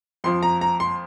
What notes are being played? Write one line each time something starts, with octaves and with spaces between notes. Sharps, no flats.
F2 F3 C6
A#5
A#5
C6